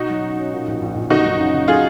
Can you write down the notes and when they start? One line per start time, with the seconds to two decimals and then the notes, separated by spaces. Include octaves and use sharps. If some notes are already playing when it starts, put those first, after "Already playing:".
Already playing: B2 D#4 F#4
0.10 F#3
0.23 C#4
0.37 C#4
0.52 A#2
0.67 A#1
0.82 A#1
0.96 A#1
1.10 F#1 D#4 F#4
1.25 F#2
1.39 C#3
1.54 C#3
1.68 F#3 F4 G#4